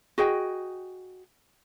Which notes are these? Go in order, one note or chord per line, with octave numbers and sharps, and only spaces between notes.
F#4 G#4 D#5 G5